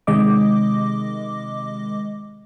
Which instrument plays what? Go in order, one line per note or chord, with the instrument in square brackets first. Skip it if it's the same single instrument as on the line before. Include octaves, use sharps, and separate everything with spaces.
[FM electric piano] C3 D#3 G#3 D#5 D6